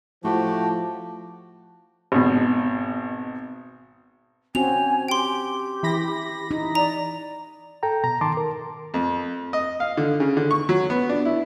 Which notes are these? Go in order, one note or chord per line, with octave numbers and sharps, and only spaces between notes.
A2 F3 A3 F#4 G4 A5
G#1 B2
C4 C#4 F#4 G#5 F7
G4 G5 C6
E3 B5 A#6
D#4
D5 A#5
A4 G5 A#5
B2 A#5
D#3 A5 C6 D6
A#4
F2
D#5
F5
D3
C#3
D3
C#6
F#3
B3
D4
E4